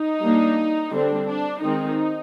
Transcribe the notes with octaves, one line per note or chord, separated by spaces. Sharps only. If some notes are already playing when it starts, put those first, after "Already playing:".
Already playing: D#4
G3 A#3 D4
D3 G3 C4 D4
D4
D#3 G#3 C4 D#4